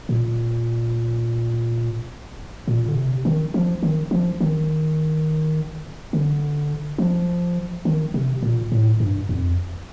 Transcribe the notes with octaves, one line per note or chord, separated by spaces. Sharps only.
A#2
A#2
D3
C3
D#3
F3
D#3
F3
D#3
D3
F3
D#3
C3
A#2
A2
G2
F2